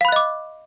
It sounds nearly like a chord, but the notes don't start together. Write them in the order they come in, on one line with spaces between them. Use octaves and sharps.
F5 B5 F#6 D#5 D6